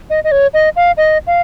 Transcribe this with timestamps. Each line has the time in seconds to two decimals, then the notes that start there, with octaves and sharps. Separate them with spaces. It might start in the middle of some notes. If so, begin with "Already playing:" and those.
0.10 D#5
0.24 D#5
0.32 C#5
0.54 D#5
0.76 F5
0.97 D#5
1.27 F5